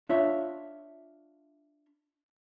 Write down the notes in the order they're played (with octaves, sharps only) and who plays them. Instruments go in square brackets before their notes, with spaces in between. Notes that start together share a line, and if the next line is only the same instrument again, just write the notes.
[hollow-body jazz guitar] D4 F4 C#5 E5